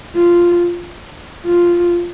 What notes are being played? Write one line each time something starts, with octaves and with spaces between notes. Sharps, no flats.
F4
F4